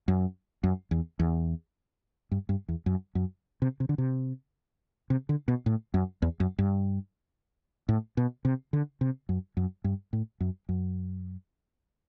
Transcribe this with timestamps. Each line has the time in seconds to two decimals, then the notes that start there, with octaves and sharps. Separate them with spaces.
0.08 F#2
0.63 F#2
0.91 E2
1.19 E2
2.31 G2
2.49 G2
2.68 E2
2.86 F#2
3.15 F#2
3.62 C3
3.80 C3
3.89 D3
3.98 C3
5.10 C3
5.29 D3
5.48 B2
5.66 A2
5.94 F#2
6.22 E2
6.40 F#2
6.58 G2
7.89 A2
8.17 B2
8.45 C3
8.73 D3
9.01 C3
9.29 F#2
9.57 F#2
9.84 G2
10.13 A2
10.40 F#2
10.69 F#2